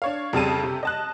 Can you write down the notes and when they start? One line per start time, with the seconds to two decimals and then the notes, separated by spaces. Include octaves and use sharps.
0.02 D4 C#5 F5
0.33 F2 C#3 G3 A5 D#7
0.63 C3
0.83 D#5 A5 F#6